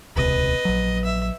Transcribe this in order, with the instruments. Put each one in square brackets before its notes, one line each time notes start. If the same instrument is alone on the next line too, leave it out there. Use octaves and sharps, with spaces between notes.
[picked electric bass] D#1 C#2 C3 [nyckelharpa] B4 D#5
[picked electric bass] A#1 F#3
[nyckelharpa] E5